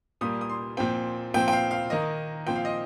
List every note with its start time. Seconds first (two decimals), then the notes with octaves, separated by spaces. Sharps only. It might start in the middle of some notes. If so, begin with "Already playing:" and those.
0.21 A#2 G3 A#3 D#6
0.41 D#6
0.49 C6
0.77 A#2 F3 C4 G5
1.34 A#2 F3 C4 G5
1.48 G5
1.53 F5
1.71 F5
1.90 D#3 A#3 D#5
2.47 A#2 F3 C4 G5
2.55 F5
2.65 D#5